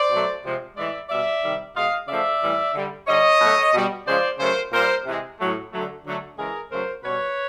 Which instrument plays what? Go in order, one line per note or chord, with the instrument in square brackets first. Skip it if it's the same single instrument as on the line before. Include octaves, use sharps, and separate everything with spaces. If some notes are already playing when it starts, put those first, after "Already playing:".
Already playing: [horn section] C5 D5
B2 F#3 A3
C3 F3 G#3
A2 E3 G#3 D5 E5
B2 G3 D5 E5
C3 D#3 G3
B2 G#3 D#5 F5
C#3 F3 A3 D5 E5
A2 E3 G3
D3 G3
D3 G3 C#5 D#5
B2 F#3 A3
B2 G3
C#3 F3 G#3 C5 D5
C#3 F#3 A3 A#4 C5
A#2 G3 A#4 C5
C3 E3 G#3
A2 F#3 A3
D3 F#3 A3
D3 F#3 A3
C#3 E3 G#3 G#4 A#4
C#3 F#3 A3 A#4 C5
B2 G3 B4 C#5